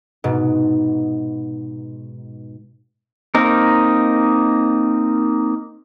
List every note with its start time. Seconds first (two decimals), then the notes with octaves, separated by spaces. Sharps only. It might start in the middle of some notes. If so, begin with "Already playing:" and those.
0.24 G#2 B2
3.35 A#3 C4 D#4 A#4